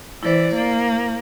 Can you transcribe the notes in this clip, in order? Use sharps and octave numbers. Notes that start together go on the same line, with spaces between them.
E3 E4 C5 D5
A#3